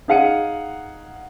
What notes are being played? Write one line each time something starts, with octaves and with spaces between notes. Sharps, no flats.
D#4 G#4 F5 F#5 C#7 D#7